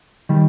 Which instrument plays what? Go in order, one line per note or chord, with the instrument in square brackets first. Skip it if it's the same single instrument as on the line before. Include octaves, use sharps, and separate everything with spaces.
[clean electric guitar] D#3 G3